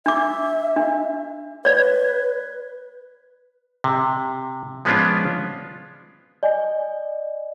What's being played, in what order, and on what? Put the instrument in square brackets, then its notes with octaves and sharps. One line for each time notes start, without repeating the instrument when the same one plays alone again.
[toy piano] D4 D6 [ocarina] E5
[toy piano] D4
[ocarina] B4 [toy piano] C#5 D5
[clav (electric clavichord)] C3
F3 G#3 B3 C#4 D4 F4
[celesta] D5 D#5 G#5